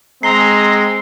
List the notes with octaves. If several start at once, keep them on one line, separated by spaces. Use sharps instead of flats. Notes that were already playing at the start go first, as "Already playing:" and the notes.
G#3 C4 A#5 C7 G7